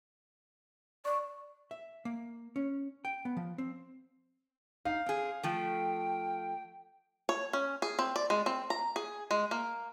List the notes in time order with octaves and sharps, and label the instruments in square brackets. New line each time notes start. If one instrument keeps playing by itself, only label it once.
[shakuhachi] D5 [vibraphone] C#6
[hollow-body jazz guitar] E5
A#3
C#4
G5
B3
F3
C4
[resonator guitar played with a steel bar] D#4 [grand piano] F5
[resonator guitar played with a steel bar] C4 G#4
[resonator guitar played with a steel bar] F3 A3 [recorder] G5
[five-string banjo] C#5
C#4
G#4
C4
D5
G#3
C4
A#5
G#4
G#3
A#3